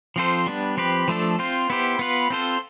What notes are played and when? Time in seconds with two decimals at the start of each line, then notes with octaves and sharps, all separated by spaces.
0.16 F3 C4 F4 A4 C5
0.47 G3 B3 D4
0.77 F3 C4 G4 B4
1.08 F3 A3 D4 A4
1.39 C4 F4 C5
1.70 B3 E4 G4 C5
1.99 B3 F4 B4
2.30 C4 F4 A4 C5